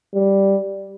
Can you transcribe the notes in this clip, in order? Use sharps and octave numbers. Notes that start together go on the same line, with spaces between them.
G3